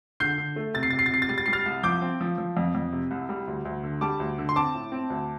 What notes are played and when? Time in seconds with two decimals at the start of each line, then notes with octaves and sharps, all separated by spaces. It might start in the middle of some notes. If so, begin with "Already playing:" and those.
0.20 D3 G6 C7
0.38 D3
0.56 A3
0.74 C3 A6
0.83 C7
0.90 C3 A6
0.99 C7
1.06 A6
1.10 C3 C7
1.22 A6
1.29 G3 C7
1.38 A6
1.46 G3 C7
1.53 F6 A6
1.66 C2
1.83 F3 D6 G6
2.02 C4
2.21 F3
2.38 F3
2.57 F2
2.75 F2
2.92 C3
3.11 C2
3.29 G3
3.48 D2
3.65 D2
3.83 D3
4.01 G3 A5 D6
4.20 D2
4.38 D3
4.49 C6
4.56 C4 A5 D6
4.75 A2
4.92 C4
5.10 D2